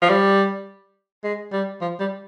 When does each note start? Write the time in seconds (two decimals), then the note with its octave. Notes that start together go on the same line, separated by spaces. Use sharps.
0.02 F3
0.10 G3
1.24 G#3
1.52 G3
1.81 F3
2.00 G3